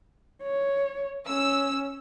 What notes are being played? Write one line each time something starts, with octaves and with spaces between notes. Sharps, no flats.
C#5
C#4 E6